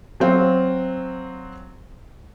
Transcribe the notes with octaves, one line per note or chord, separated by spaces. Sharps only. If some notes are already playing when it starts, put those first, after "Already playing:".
F#3 C4 F5